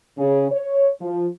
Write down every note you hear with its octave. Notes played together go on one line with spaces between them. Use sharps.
C#3
C#5
F3